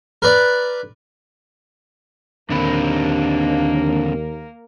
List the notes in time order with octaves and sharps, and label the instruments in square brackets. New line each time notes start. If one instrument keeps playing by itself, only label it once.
[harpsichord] A#4 B4 D5
[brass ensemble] D#2 [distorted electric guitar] D3 C4 [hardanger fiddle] A#3 A#4 [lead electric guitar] D4 B5